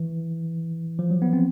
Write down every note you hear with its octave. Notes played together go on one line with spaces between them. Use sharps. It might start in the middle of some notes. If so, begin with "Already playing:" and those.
Already playing: E3
F3
F#3
B3
C4